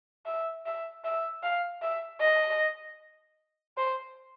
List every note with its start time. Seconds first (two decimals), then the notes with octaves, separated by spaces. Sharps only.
0.26 E5
0.66 E5
1.04 E5
1.43 F5
1.82 E5
2.20 D#5
3.77 C5